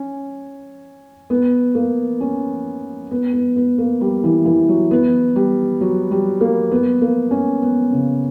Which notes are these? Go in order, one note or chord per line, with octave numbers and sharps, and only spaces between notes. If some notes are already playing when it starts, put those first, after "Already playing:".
Already playing: C#4
B3
A#3
C#4
B3
B3
B3
A#3
G3
E3
E3
F#3
B3
G3
F#3
G3
A#3
B3
A#3
C#4
B3
C#3